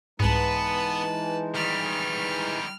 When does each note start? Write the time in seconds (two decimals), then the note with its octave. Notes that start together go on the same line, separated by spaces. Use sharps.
0.20 C2 G#2 E3 G#3 B3 D#4 B4 A5
1.55 D#3 G3 F6